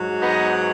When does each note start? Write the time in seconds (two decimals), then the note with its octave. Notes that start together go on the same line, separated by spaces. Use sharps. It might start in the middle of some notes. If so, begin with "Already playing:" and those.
Already playing: G#2 F#3
0.21 B3 D#4